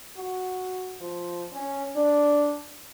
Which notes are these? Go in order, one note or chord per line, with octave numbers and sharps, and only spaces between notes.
F#4
F3
C#4
D4